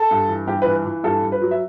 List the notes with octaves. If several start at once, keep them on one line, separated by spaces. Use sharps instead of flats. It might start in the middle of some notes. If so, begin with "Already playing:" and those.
Already playing: A4
G2
E3
G2 G4
E3 B4
E3
G2 A4
G2
B4
F#3
E5